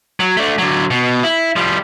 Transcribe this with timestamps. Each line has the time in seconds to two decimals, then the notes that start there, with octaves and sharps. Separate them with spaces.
0.20 F#3
0.37 A3 D4
0.58 D3 F#3
0.91 B2
1.23 E4
1.56 F3 G3